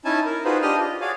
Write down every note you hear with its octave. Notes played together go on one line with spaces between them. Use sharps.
C#4 D#4 E4 G#5 A5
A#4
D#4 F4 F#4 G#4 B4 C5
D4 G4 D#5 D#6 F6
F4
F#4 G#4 C#5 D5 F5